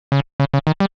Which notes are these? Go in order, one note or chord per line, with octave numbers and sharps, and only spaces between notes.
C#3
C#3
C#3
D#3
G3